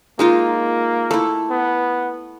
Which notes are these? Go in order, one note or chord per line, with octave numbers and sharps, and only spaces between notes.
G#3 A#3 D#4 F4
A3 E4
B3